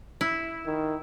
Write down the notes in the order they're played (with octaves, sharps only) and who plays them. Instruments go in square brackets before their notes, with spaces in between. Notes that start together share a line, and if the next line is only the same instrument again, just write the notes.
[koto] E4
[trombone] D#3